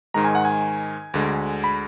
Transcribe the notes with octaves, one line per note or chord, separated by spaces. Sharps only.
G#2 D#3 G#3 A#5
G#5
F#5
G#5
D2 D3 G#3
B5